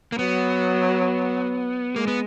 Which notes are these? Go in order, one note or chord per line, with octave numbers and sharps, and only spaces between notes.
A#3
F#3 B3
G#3 A#3
B3